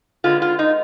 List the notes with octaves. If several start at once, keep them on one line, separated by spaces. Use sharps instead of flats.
D3 G#3 B3 F4
F4
D#4